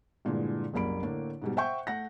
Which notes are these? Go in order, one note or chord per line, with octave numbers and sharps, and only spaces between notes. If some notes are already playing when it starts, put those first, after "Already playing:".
G2 A#2 D3 E3 G#3
F#1 C2 F#2 A#3 B5 D7
A2 D3 A3 A#3 D4
G#2 B2 G3
C5 E5 F#5 G5 C#6 G6
A3 F#5 A#6